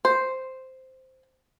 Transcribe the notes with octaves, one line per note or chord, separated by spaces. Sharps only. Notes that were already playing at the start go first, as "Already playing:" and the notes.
C5